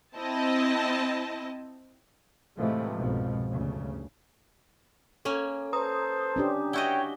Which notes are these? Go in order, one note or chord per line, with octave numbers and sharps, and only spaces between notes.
C4 E4 D#5 A5
A2 C3 E3 F3 G#3 A3
C2 F2 G#2 B2 F3
G1 D2 C#3
A#3 C#4 A4 G#5
A4 B4 C5 A#5 D#6
C#4 D4 G4
E4 F#4 C#5 D#5 F#5 G5 G7